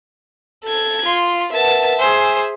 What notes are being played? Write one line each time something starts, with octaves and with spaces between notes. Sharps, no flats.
A4 G#6
F4 C6
A#4 B4 E5 F#5 A5
G#4 C5 G#5 E6